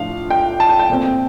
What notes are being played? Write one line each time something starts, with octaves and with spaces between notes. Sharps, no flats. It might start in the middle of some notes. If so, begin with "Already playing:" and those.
Already playing: A2 F3 D4 F5
G5
A5
G5
G5
A#2 A3 C4